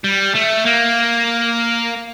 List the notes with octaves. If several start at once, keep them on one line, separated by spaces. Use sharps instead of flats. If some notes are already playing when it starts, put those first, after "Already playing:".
G3
A3
A#3